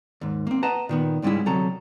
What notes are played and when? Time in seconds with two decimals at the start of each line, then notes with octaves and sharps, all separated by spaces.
0.21 D#2 G#2
0.47 A#3 C4
0.63 B4 D#5 F#5 A5 A#5
0.89 A#2 D#3 B3
1.22 C#2 G#2 G3 G#3 C#4 E4
1.46 D2 C3 F#3 A4 A#5